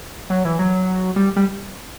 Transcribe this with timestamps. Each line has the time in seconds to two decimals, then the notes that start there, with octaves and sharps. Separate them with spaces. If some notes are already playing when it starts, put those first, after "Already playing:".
0.30 F#3
0.45 E3
0.59 F#3
1.16 G3
1.36 G3